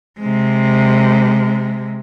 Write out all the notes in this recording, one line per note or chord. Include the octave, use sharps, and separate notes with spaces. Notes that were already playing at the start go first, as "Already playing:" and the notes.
C3 G#3